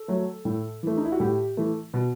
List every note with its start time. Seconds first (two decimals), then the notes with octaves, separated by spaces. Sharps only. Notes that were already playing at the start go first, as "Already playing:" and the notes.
Already playing: A4
0.08 F#3 A3
0.45 A2
0.83 E3 A3
0.97 D#4
1.05 E4
1.12 F#4
1.20 A2 G4
1.57 E3 A3
1.94 B2